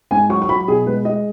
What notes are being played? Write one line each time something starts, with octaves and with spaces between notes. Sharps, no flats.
G#2 G#5
F#3 C#6
C#6
F#3 B5
B2 G#4
G#3 B4
G#3 D#5